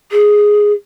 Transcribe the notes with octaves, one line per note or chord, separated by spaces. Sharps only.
G#4